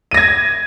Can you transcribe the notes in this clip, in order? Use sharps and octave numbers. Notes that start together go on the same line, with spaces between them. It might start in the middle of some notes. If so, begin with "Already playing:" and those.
G#6 A#6 D#7